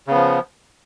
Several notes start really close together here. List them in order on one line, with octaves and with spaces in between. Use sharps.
C#3 B3 F3